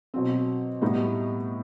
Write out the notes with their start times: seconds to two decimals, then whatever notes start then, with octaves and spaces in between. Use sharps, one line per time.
0.14 B2 F#3 C4
0.81 A2 G3 B3 D#4